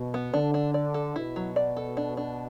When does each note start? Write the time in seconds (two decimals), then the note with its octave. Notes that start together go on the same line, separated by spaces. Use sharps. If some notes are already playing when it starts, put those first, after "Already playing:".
Already playing: B2
0.14 B3
0.34 D3 D4
0.54 D4
0.74 D5
0.94 A4
1.15 B2 E4
1.36 F#3
1.56 D5
1.77 A4
1.97 D4
2.17 D4